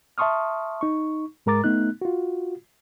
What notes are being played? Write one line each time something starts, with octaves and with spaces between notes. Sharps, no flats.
E5 A5 C6 C#6 D#6 F6
D#4 C#6
G#2 G#3 A#4 A#5 D6 A6
A3 B3 D#4 F#6
F4 F#4